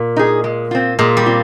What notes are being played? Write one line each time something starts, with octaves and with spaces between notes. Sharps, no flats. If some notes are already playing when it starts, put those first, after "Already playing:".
Already playing: A#2
D#4 G#4
G#3
C4 F4
A#2 G#3
G3
C4 F4